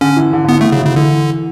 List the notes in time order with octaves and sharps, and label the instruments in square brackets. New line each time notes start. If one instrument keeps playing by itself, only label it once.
[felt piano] D3 [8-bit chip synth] C#4
[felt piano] E3
D3
D3
[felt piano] E3 [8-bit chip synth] B3
[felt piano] D3 [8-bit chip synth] A3
[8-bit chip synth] C#3 [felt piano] F#3
[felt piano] E3
[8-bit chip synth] C#3
[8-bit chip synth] D3 [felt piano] E3